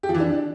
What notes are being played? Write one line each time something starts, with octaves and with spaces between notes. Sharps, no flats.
G4
F3
E3
D4